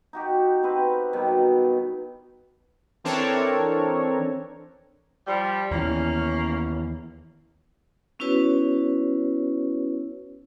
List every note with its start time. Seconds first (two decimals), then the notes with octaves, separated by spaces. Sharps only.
0.13 D#4 F#4 G4
0.63 C4 B4 D#5
1.13 B2 D#3 F#3 G3
3.04 E3 C4 D4 A4 A#4 C#5
5.27 F3 G3
5.71 D#2 E3 A#3 C#4
8.19 B3 C#4 E4 F#4 B4 C#5